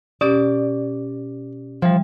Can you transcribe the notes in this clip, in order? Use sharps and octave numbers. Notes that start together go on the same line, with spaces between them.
B2 C#4 G4 D5
E3 F3 G3